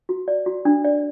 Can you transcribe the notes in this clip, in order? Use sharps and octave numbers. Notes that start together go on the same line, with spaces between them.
F#4
D5
F#4
D4
D5